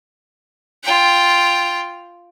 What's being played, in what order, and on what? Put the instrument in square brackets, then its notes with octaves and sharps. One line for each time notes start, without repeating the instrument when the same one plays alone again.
[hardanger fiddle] F4 G5